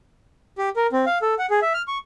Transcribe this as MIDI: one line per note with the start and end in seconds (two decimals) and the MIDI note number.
0.58 0.69 67
0.76 0.87 70
0.93 1.05 60
1.06 1.18 77
1.22 1.34 69
1.39 1.46 78
1.50 1.60 68
1.62 1.73 76
1.74 1.82 89
1.88 1.98 85